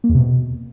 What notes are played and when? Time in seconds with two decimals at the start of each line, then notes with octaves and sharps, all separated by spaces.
0.04 A#3
0.09 E2
0.15 C3
0.20 B2